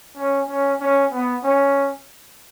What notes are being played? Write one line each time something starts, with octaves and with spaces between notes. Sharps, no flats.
C#4
C#4
C#4
B3
C#4